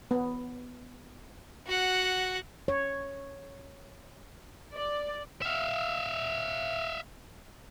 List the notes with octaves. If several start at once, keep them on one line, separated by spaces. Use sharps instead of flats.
B3
F#4 F#5
C#5
D5
E5 F5